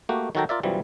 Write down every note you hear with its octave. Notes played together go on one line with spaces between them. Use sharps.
A3 A#3 F#4 G4
D#3 F#3 F#4 A4 G5 A#5
F4 A#4 D5 E5
B1 F#2 E3 F3 G3